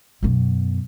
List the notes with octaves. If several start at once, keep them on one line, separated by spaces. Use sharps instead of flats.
F#2 B2